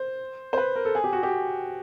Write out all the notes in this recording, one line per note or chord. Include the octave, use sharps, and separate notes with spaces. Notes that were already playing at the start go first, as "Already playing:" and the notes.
Already playing: C5
C5
B4
A#4
A4
G#4
G4
F#4
G4